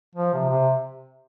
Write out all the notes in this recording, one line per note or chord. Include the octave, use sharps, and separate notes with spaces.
F3
C3
C3